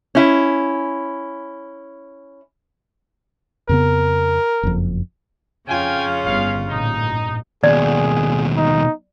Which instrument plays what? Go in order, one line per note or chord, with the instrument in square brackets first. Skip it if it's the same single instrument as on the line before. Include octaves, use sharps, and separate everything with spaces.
[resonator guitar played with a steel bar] C#4 E4
[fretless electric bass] F2 C#3 B3 [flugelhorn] A#4
[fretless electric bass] F#1 F2
[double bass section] F2 [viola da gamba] C#3 C#4 F4 [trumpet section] G5 G#5
[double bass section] G1 [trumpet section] F5
[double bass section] A1 G2 A#2 [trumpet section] D#4
[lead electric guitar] D#2 B2 [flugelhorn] G#4 [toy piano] D5
[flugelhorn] D#4